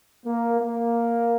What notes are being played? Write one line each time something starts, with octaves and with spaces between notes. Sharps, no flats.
A#3
A#3